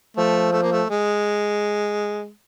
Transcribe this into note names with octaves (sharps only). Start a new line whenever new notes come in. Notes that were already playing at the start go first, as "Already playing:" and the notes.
F3 A3
A3
A#3
A3
G#3